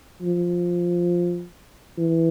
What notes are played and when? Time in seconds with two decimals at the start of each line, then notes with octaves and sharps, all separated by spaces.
0.22 F3
1.98 E3